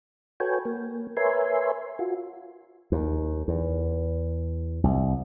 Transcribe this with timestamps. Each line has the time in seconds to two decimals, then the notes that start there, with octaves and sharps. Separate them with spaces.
0.40 F#4 A4 B4 C#5 G5 G#5
0.65 A#3
1.17 A#4 B4 C#5 E5 G#5 C6
1.99 F4 F#4
2.92 D#2
3.48 E2
4.84 C2